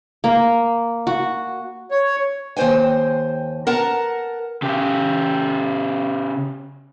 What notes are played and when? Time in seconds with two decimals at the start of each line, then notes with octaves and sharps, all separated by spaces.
0.24 A#3
1.07 F#4
1.91 C#5
2.57 D#2 G#2 C5 G5 G#5
3.67 A#4 F#5 A5 A#5
4.62 C#3 G4